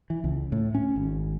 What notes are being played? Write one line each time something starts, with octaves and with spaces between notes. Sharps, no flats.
E3
C#2
A2
C#4
G#1